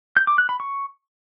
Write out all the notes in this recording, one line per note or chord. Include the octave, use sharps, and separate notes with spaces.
G6
D6
F#6
B5
C#6